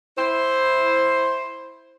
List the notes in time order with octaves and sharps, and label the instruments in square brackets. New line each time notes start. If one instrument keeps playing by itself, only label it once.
[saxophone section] E4 C5